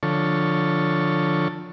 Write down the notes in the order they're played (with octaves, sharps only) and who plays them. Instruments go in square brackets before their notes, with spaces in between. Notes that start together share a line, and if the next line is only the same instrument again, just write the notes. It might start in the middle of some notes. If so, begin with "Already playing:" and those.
[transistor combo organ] D3 F3 A4 C#5